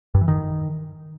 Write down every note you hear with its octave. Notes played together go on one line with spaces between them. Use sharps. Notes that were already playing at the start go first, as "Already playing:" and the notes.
G2
E3
D#3